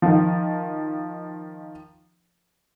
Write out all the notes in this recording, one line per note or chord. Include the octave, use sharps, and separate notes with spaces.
D#3 F3